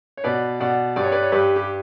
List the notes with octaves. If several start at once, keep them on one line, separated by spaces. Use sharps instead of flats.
C#5
B2 B4 D5
B2 D5 F#5
G2 D5
C#5
B4 D5
C#5
G2 G4 B4
G4